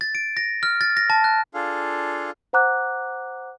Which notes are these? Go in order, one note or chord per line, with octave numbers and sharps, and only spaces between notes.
A6
D7
A#6
F6
A6
A#6
A5
F#6
D4 F4 G#4 A4 F5
C5 F#5 A#5 D6 F#6